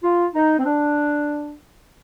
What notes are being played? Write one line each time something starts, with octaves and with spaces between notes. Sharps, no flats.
F4
D#4
C4
D4